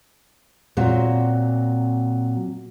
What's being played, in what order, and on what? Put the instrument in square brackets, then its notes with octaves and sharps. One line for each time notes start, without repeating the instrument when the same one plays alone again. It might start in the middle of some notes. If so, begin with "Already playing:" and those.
[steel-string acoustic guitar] A#2 F#3 C4